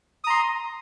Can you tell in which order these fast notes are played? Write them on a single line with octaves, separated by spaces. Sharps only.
D#6 A#5 C6